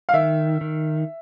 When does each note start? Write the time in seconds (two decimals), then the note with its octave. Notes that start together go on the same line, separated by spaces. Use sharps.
0.09 F5
0.13 D#3 E5
0.61 D#3